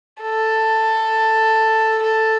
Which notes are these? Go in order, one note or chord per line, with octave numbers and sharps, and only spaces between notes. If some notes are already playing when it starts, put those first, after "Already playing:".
A4
A4